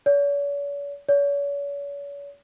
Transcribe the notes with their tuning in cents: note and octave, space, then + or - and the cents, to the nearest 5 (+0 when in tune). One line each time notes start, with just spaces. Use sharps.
C#5 +45
C#5 +40